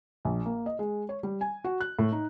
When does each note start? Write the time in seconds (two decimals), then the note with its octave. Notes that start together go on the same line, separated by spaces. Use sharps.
0.25 A#1
0.46 A#3
0.66 D#5
0.79 G#3
1.09 C#5
1.23 G3
1.41 G#5
1.64 F#4
1.81 F#6
1.99 A2
2.12 D#4